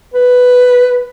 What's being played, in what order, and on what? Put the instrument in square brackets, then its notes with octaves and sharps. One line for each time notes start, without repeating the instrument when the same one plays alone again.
[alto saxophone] B4